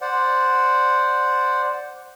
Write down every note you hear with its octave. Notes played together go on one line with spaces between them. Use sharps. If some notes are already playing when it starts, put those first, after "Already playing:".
C5 D5 F#5